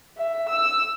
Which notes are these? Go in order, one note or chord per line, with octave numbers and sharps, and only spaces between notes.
E5
E6